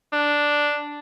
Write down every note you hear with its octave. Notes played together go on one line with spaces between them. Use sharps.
D4